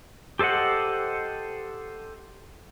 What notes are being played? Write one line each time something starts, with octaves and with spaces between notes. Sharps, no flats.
G4 A4 C5 D#5 F#5